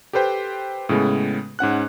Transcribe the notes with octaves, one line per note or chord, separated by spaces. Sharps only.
G4 A4 B4 C5 G5
A2 C#3 G#3 B3
G#2 C#4 F#5 F#6